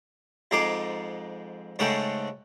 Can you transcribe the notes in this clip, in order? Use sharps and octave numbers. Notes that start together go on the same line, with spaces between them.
F2 G#2 G#3 A#5 C6 D6
G#2 C#3 G#3 A3 F#5 G5